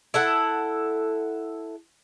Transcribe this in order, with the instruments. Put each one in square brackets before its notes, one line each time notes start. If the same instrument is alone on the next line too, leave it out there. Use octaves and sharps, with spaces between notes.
[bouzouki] E4 A4 F#5